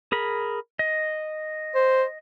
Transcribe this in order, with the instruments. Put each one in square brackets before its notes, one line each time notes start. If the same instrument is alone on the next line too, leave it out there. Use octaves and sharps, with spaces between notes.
[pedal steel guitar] G#4 A#4 B5
D#5
[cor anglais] C5